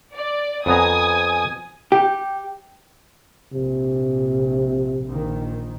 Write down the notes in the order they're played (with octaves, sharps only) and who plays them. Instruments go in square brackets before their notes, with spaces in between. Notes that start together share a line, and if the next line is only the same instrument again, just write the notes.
[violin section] D5
[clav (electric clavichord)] F2 B3 A#5 [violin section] G#5 D#6 G#6
[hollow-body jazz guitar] G4 [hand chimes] G5
[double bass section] A#1 [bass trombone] C3
[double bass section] A#1 D#3